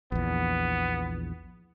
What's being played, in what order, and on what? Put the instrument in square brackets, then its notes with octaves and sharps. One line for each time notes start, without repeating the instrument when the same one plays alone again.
[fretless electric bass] A#1 E2 [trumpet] B3